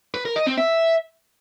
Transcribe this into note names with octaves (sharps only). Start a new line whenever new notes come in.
B4
A#4
D#5
C4
E5